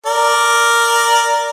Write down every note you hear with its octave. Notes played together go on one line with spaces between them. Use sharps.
A#4 D5